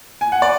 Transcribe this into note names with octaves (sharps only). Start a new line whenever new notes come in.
G#5
F#5
D5